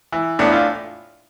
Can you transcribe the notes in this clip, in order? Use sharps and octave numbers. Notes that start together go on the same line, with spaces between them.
E3
A2 B3 D4
E4
D4 F4